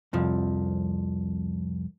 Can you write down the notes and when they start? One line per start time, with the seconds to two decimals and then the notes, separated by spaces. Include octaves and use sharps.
0.13 C2 F2 F3